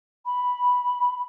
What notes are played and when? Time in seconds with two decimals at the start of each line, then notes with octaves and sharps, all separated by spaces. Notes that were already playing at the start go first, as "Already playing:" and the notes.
0.25 B5